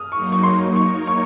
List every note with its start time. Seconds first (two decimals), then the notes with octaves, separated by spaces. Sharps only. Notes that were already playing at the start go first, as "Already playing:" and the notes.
Already playing: D#6 F6
0.11 F#3 A#3 D#4 C#6
0.32 C#6
0.43 C6
0.75 A#3 D#4 A#4 C#5 C#6
1.07 C#6